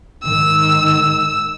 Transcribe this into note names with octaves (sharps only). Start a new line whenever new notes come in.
G#2 D#3 E6